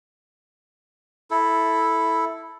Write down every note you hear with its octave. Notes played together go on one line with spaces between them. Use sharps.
E4 A4